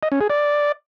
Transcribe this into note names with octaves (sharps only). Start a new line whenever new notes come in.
D#5
C#4
G#4
D5